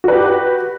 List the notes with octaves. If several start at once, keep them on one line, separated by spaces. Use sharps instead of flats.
F#4 G4 B4